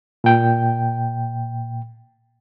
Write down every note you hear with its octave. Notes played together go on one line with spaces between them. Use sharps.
A#2 G5